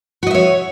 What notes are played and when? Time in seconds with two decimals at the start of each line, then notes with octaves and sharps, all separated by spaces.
0.23 F#4
0.27 D#5
0.31 E5
0.35 C#5